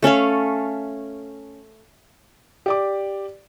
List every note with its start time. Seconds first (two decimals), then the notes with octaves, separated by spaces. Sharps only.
0.02 A3 C#4 A4 F5
2.66 G4 D5 D6